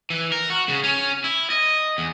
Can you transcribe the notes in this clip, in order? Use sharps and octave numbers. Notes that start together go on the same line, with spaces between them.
E3
A#4
F#4
C#3
C#4
E4
D#5
E2